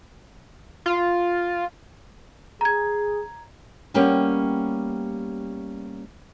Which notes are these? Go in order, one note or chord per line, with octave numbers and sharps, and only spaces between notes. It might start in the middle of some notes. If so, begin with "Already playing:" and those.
F4
G#4 A#5 G#6
G3 A#3 B3 C#4 G4